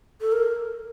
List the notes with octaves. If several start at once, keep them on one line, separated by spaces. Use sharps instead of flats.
A4
A#4